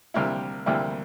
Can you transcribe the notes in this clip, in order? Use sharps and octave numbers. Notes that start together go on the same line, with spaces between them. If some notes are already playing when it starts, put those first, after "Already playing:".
D2 C3 G3 A#3 E4 A#4
D2 C3 G3 A#3 E4